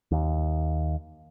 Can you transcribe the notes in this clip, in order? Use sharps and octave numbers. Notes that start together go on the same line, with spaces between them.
D#2